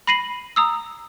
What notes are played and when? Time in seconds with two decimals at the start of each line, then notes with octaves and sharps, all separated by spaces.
0.07 B5 A#6 C7 D#7 F#7
0.56 A#5 D#6 E6